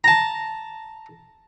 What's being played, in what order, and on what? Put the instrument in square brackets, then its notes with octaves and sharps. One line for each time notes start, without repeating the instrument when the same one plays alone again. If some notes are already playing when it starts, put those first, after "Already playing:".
[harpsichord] A5 A#5